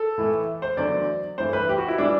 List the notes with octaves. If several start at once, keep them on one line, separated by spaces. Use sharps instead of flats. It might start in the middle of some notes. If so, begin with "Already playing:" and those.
Already playing: A4
A2 E3 A3
C5
E2 D3 F#3 A3 D5
G2 E3 A3 C5
B4
G4
F#4
E4
E3 G3 D4